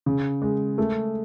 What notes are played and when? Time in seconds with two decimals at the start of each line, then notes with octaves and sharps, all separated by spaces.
0.06 C#3
0.42 G#3
0.78 A3